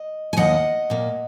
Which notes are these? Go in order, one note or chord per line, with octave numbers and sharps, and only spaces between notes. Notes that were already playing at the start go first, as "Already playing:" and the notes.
Already playing: D#5
G#5
D#2 D#3 A#3 D#5 F#5
A#2 A#3